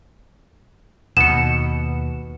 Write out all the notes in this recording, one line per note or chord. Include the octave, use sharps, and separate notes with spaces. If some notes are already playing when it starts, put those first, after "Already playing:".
D#2 B2 C#7 E7